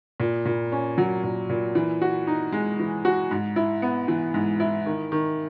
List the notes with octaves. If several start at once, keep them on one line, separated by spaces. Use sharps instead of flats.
A#2
A#2
C#4
F#3
A#2
A#2
E3
F#4
D#4
G#3
E3
F#4
G#2
E4
B3
E3
G#2
E4
D#3
D#3